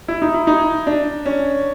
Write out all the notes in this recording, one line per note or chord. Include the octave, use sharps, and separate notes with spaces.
E4
D#4
E4
D#4
D4
C#4